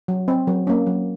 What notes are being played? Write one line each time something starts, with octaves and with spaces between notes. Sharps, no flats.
F#3
C4
F#3
A#3 C#4
F#3